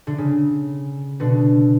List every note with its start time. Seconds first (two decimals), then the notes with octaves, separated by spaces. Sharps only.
0.07 D3
0.18 C#3
1.20 B2 D3